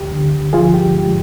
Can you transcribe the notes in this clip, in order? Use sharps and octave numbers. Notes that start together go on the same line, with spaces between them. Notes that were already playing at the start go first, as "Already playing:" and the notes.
Already playing: D2 G4
D3
F3 F4 G#4
G4
G#2